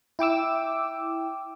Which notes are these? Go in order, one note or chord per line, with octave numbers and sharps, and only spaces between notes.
E4 G5 D6 E6